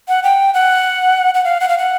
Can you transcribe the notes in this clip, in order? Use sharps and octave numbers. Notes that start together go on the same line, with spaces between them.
F#5
G5
F#5
F#5
F5
F#5
F5
F#5